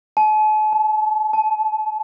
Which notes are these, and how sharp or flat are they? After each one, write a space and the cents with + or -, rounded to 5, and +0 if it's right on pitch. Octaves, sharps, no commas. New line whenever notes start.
A5 -45
A5 +0
A5 -15